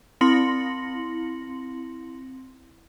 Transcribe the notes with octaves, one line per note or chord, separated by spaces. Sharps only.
C4 E4 C6 A#6 C#7 F#7